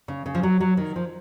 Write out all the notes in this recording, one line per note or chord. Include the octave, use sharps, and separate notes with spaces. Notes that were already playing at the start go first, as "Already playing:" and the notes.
C#3
C#3
F3
F#3
F#3
D#3
F3